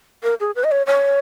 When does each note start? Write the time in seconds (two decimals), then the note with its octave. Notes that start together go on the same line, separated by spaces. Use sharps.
0.23 A#4
0.40 G#4
0.56 B4
0.64 D#5
0.71 C#5
0.87 C#5